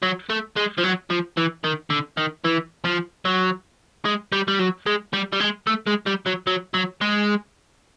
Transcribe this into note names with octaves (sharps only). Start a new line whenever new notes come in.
F#3
A3
G#3
F3
F#3
F3
E3
D#3
D3
D#3
E3
F3
F#3
G#3
G3
G3
F#3
G#3
G3
G3
G#3
A3
G#3
G3
F#3
F#3
F#3
G#3